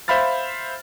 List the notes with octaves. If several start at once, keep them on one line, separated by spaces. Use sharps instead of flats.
C5 E5 F5 B5 F6 A6